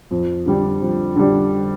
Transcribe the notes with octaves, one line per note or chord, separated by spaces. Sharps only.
F2
D3 G3 D4
F2
D3 G3 D4